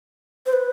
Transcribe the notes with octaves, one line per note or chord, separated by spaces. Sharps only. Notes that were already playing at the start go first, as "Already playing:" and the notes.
C5
B4